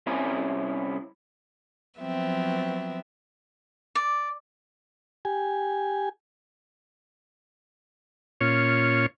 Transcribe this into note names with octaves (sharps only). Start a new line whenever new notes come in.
C2 C4 C#4 E4 G#5 A#5
F3 F#3 B3 C4 E5
D5
G4 G#5
A#2 C#4 F4 C#5